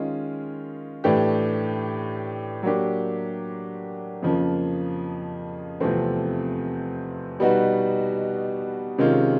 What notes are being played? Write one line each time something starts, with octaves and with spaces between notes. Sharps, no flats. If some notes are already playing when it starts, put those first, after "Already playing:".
Already playing: D#3 G#3 C#4 F4 G#4
A2 E3 A3 D4 G4
F#3 A#3 D4 G4
F2 C#3 F3 A#3
E2 C3 F3 A3 C4
B2 G3 B3 D#4 F#4
C3 D#3 G#3 C#4 F4